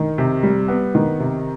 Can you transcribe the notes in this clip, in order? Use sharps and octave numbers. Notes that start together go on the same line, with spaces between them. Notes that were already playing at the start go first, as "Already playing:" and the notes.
Already playing: D#3
C3
G3
B3
D#3
C3